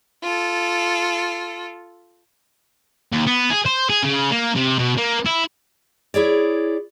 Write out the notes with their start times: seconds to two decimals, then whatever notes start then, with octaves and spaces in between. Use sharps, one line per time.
0.23 F4 A4
3.12 D#2
3.27 B3
3.50 G#4
3.66 C5
3.90 G#4
4.03 C#3
4.31 A#3
4.55 C3
4.79 B2
4.98 A#3
5.25 E4
6.14 E4 G#4 C#5 D5